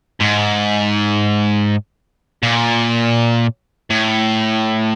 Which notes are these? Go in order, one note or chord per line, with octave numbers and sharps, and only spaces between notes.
G#2
A#2
A2